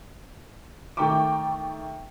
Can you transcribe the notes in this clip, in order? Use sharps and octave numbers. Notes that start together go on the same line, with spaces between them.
D#3 A3 G5 A#5 C#6 D6